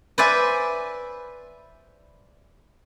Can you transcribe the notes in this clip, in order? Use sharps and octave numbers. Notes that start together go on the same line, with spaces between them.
B4 C5 D5 E5 G#5